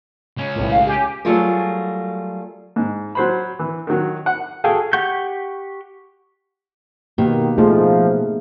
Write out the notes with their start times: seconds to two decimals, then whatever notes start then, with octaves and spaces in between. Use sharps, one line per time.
0.37 C#2 C#4
0.56 B1 A2
0.71 F5
0.87 G4 G#5
1.25 F#3 G3 A3 F4 G#4 A#4
2.76 G#2
3.15 F#3 C5 B5
3.59 E3
3.87 D#3 F#3
4.26 F#5
4.64 F#4 G#4 A4 F5 G5 G#5
4.93 G4 F#5 C#6 G6
7.18 B2 D#3 A#3 G4
7.58 F3 A3 D#4 G#4